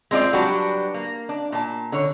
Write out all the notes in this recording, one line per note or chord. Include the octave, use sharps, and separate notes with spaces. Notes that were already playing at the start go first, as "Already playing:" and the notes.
G#3 C4 D4 F4 D5
F#3 G3 D4 F#4 G4 B4
A#3
D4
A#2 A5
D3 C#5